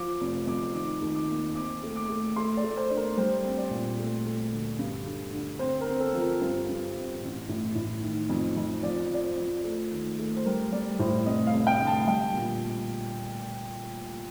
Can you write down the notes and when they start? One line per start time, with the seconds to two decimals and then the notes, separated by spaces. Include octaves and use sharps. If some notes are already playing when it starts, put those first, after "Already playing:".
Already playing: F3 D6
0.21 F1
0.47 F2 D6
0.74 D#3 D6
1.01 D#2
1.15 D6
1.28 A#3
1.55 C4 D6
1.83 A3
1.96 D6
2.09 A3
2.36 A3 C6
2.57 D5
2.63 A3
2.77 C5
2.90 D4
2.96 A#4
3.17 G3 C5
3.44 C4
3.57 D5
3.70 A#2
3.98 A3
4.26 A3
4.52 D2
4.79 G2
5.06 D3
5.33 D3
5.59 C4 C5
5.81 A#4
5.87 C4
6.00 A4
6.13 F3
6.20 A#4
6.41 G2 C5
6.68 G2
6.95 C4
7.21 A1
7.49 A2
7.75 A2
8.02 D#3
8.29 F2
8.57 F2
8.83 F3 D5
9.11 F3 D5
9.23 C5
9.37 F3
9.64 A3
9.91 D#2
10.19 A3
10.36 C5
10.45 G3 A#4
10.72 G3 D5
10.99 A2 C5
11.26 F1 D#5
11.47 F5
11.54 F1
11.67 G5
11.80 D3
11.87 A5
12.07 G3 G5
12.34 A#2